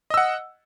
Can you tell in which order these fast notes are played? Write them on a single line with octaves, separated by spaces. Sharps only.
D#5 E6 F#5